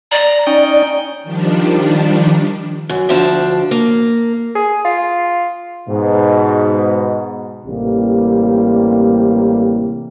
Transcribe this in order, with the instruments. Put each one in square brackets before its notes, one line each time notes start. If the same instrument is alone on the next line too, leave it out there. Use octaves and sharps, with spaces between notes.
[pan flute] D5 [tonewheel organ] A#5
[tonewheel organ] C#4 D#4 G5
[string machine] D#3 F3 G3 D4
[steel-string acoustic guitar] F#2
D2 F3 D4
A#3
[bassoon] G#4
F4
[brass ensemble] G#2 B2
[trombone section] A1 C3 G3 A#3